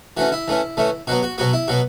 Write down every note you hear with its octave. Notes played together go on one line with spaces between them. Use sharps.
E3 A3 C#4 F#4
E4
E3 A3 C#4
E3 A3 C#4
B2 F#3 B3 F#4
F#4
B2 F#3 B3 F#4
E4
B2 F#3 B3 F#4